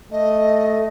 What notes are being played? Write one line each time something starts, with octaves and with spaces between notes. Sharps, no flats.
A3 D#5